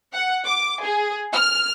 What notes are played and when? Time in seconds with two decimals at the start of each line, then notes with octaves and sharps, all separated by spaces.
0.13 F#5
0.45 D6
0.83 G#4
1.32 F6